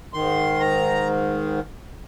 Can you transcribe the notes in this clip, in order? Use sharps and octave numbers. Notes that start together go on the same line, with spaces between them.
G#2 D#3 C6
A#5